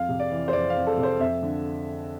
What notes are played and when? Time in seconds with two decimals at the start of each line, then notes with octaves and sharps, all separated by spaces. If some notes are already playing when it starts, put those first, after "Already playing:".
Already playing: F2 F5
0.09 C3
0.20 D5
0.31 E3
0.48 C5
0.53 F2 D5
0.70 F5
0.75 F2
0.87 A4
0.97 C3
1.03 C5
1.20 F2 E5
1.42 D3